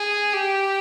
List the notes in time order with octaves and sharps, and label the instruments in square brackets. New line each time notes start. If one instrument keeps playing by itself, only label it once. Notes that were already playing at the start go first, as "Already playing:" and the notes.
Already playing: [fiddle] G#4
G4